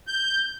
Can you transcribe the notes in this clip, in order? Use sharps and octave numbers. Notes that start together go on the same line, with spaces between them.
G6